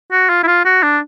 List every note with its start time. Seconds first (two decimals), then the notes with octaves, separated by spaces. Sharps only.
0.12 F#4
0.29 F4
0.43 E4
0.47 F4
0.65 F#4
0.83 D4